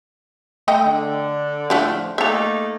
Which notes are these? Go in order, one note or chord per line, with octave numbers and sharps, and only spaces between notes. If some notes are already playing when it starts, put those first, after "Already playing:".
A3 D#5 G5
D3
A2 D3 F3 A3 D4
A3 A#3 D#4 E5 A#5